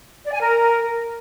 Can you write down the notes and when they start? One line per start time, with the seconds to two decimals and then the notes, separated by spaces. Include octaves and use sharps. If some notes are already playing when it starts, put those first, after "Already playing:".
0.24 D5
0.32 G#5
0.40 A#4